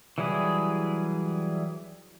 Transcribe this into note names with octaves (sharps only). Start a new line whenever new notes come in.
E3 F#3 G3 E4 G#4